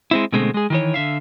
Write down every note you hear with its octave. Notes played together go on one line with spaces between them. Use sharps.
G#3 C4 E4
B2 D3 G#3 A3 B3 C4
G#3 G#4
D#3 E3 C#5
D3 E5 F5